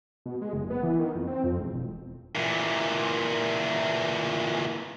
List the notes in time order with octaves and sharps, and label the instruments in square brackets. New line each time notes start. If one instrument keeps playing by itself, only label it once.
[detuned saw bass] B2
G#3
F#1
B3
E3
D#3
F2
C4
F2
E1
E1
[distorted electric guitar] A#2 E3